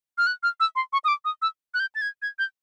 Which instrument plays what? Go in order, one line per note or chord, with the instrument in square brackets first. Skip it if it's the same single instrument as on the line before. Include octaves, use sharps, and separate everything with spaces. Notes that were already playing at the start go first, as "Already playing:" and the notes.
[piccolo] F6
F#6
F6
E6
C6
C#6
D#6
D6
D#6
E6
F#6
G6
A6
G#6
G#6
G6